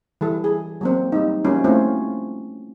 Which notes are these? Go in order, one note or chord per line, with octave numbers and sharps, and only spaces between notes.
E3 G3 A4
G#4
F#3 A#3 C4
G3 D#4
F3 G3 A#3 C#4 F4 F#4
A3 C4 C#4 E4 F4